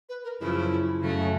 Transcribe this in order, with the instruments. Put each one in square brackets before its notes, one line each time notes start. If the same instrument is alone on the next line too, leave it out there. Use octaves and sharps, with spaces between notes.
[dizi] B4
A#4
[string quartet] F#2 C#3 F3 [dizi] E4
[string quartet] F#2 C#3 F#3 A3 C#4